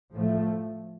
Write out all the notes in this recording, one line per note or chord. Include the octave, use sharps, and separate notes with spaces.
A2 F3 A3